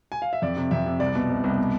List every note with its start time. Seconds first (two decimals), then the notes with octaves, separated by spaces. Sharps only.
0.12 G#5
0.22 F5
0.33 E5
0.42 F2 D5
0.57 C3
0.71 F2 E5
0.86 C3
1.00 C2 D5
1.15 B2
1.30 C2
1.44 C2
1.58 B2